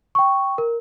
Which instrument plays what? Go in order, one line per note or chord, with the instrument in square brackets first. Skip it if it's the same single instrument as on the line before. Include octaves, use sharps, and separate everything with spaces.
[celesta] G5 C#6
A#4